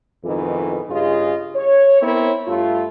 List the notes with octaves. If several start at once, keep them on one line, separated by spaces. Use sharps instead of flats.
F2 G#2 B2 D#3 E3
G2 C#3 F4 G#4 D#5
C#5
B3 C4 E4 A#4 C#5
G2 A3 F4